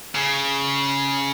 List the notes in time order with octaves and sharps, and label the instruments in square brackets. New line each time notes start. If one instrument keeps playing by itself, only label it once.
[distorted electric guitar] C#3